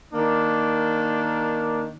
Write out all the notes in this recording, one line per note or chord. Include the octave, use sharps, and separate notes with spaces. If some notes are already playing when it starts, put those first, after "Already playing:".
D#3 A#3 D4